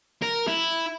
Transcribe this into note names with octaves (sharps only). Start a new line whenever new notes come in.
A#4
E4